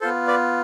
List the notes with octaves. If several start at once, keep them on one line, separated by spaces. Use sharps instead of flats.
B3 F4 A4 C5
B4 D5